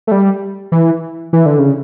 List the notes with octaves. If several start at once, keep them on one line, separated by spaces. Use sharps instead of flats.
A3
G3
E3
E3
D3
C#3